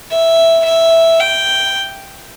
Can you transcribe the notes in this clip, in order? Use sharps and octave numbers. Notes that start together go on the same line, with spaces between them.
E5
E5
G5